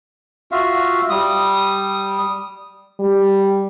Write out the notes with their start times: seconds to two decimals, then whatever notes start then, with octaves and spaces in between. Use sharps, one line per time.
0.51 F4 F#4 E5 F5
1.10 G3 D#6
3.00 G3